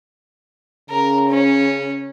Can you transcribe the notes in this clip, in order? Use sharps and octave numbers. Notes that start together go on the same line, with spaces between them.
C#3 A#4
C#4